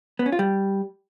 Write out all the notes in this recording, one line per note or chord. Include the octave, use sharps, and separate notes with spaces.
B3
C#4
F4
G3